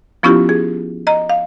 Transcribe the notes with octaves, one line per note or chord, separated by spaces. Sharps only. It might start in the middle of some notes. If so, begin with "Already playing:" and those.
F3 B3 C#4 E4 F4 G4
G#4
D#5 A#5
F5